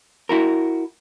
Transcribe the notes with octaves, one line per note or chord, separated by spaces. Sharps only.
E4 F#4 A#4